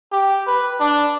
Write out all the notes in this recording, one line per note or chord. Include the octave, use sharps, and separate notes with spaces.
G4
B4
D4